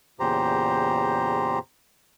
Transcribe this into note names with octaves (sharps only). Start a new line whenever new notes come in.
E2 A#2 C#3 G4 C5 A#5